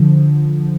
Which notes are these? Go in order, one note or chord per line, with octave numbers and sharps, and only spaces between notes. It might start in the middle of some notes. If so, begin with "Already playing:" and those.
Already playing: D3 F3